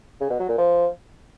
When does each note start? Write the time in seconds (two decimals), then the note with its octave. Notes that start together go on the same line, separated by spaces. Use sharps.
0.20 C#3
0.30 B2
0.39 F#3
0.49 A#2
0.58 F3